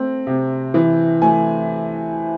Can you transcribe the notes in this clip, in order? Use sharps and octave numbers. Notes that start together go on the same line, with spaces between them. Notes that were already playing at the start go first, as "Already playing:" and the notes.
Already playing: A3 C4
C3
E3
A3 G#5